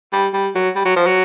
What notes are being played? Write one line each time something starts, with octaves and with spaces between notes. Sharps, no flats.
G3
G3
F#3
G3
F#3
F3
F#3